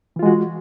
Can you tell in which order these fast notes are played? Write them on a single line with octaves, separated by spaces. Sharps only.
E3 F4 G#3 F#4